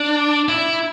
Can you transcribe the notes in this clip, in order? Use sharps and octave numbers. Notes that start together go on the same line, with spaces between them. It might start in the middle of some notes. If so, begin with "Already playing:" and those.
Already playing: D4
E4